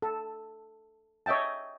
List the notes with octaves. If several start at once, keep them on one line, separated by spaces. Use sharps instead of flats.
A4
C#5 D#5 E5 G5 A5